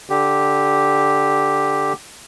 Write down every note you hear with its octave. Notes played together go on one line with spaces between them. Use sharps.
D3 G4